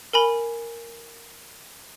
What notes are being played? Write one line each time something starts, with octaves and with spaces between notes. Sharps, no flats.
A#4 G#5 B5